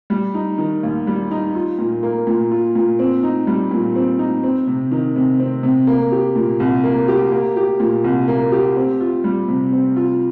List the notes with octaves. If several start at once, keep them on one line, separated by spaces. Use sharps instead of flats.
G3
D#4
D#3
D#2
G3
D#4
F4
A#2
A#3
A#2
F4
A#2
C4
D#4
G3
A#2
C4
D#4
C4
C3
D#3
C3
C4
C3
A#3
G4
A#2
C2
A#3
G4
A#3
G4
A#2
C2
A#3
G4
C4
F4
G3
C3
C4
F4